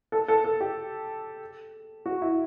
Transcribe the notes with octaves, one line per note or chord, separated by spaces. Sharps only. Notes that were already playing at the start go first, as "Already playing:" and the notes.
A4
A4
A4
G4
F#4
E4